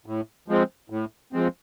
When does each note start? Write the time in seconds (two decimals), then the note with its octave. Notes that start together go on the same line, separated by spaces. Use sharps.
0.06 A2
0.48 F3 G#3 C4
0.90 A2
1.33 F3 G#3 C4